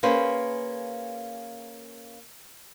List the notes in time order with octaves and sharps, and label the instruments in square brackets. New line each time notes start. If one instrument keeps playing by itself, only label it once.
[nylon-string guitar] A#3 C#4 G#4 B4 C5